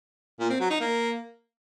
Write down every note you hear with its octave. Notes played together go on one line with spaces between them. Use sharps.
A#2
C4
F#3
D#4
A#3